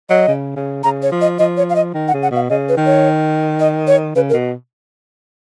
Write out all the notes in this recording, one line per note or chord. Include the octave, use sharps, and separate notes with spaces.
F#3 D#5
C#3
C#3
C#3 A#5
C#5
F3
D#5
F3 D#5
C#5
F5
D#5
D#3
F#5
C#3
F#5
B2
F5
C#3 D#5
B4
D#3
C#5
D#5
C#5
C#3 B4
A#4
B2